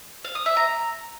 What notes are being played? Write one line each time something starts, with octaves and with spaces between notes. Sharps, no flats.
F5
D#6
E5
A#5